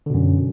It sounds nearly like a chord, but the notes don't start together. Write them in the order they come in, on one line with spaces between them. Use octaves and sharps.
D3 B2 F#2